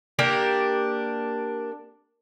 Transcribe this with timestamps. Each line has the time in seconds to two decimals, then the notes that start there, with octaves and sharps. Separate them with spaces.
0.19 A#3 D4 G4 A#4